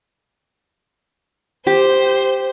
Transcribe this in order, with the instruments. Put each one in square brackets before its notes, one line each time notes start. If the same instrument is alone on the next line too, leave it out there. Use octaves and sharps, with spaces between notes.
[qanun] G4 [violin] C5